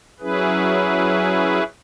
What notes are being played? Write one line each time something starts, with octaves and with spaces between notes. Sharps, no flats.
F#3 C#4 E4 G#4 B4